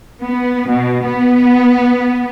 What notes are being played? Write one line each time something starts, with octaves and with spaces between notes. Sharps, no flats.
B3
B2
B3